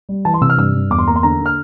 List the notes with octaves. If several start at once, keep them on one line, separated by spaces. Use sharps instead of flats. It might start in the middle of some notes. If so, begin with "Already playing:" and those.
G3
E3 A5
C6
C3 E6
F6
G2 E6
G2
E2 D6
C6
A#3 A#5
C6
D3 A#5
D3
F6